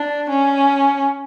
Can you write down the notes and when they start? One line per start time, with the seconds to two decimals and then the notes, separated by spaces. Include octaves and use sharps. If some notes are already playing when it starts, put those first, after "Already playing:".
Already playing: D4
0.29 C#4